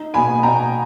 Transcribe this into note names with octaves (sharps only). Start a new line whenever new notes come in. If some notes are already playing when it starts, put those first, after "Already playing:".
Already playing: D#4
B2 G#5 B5
B2 G5 A#5